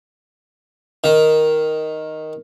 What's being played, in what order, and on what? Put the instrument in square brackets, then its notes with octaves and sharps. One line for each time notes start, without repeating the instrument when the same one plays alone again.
[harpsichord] D#3